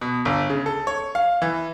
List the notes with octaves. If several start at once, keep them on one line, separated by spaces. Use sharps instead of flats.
B2
G1
C#3
A4
C#5
F5
E3